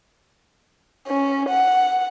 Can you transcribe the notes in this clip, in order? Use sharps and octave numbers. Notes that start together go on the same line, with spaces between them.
C#4
F#5